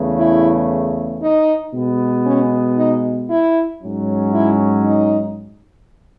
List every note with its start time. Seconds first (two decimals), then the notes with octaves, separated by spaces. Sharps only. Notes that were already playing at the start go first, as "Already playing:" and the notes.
Already playing: E2 C#3 E3 A3
0.17 E4
1.22 D#4
1.73 B2 G#3 B3
2.25 C#4
2.77 D#4
3.29 E4
3.81 G#2 F#3 C#4
4.33 E4
4.84 D#4